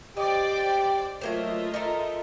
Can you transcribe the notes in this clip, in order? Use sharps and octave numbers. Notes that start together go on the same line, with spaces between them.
G4 C5 D5 D#5 G5
F#3 A3 A#3 F4 C5 D#5 E5
D#4 A4 A#4